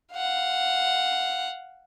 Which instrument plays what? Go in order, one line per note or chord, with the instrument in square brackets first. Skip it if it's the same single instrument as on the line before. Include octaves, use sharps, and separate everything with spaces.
[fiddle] F5 F#5